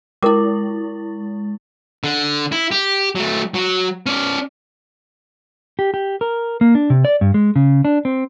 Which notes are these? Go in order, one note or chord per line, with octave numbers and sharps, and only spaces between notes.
G#3 E4 A#4 D6
D3
E4
G4
F#3 A3
F#3 F#4
C#4 D5
G4
G4
A#4
A#3
D4
C3
D5
G2
G#3
C#3
D4
C4